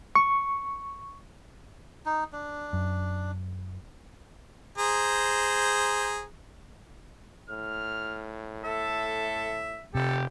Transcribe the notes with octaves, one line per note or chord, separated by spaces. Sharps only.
C#6
D#4
D4
F#2
G#4 C5 A#5
A2 F6
A4 E5
F1 C3 G4 A4